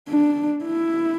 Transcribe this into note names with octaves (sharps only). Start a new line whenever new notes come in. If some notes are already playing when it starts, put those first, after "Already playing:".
D4
E4